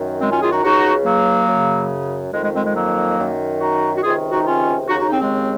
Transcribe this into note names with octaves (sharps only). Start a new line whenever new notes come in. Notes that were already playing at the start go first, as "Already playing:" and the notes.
Already playing: F#2 D#3
G#3 C4
C#4 F4
F4 G#4
D#4 F#4
C#2 C#3 D#4 F#4
F#3 A#3
F#2 C#3
F2 D#3 G#3
G#3
G#3 C4
G#3
F#3 A#3
F#2 D#3
D#4 F#4
F#4
C#2 C3 D#3 F4 G#4
D#4 F#4
C#4 F4
D#2 C#3 D#4 F#4
D#4 F#4
C4 D#4
G#3 C4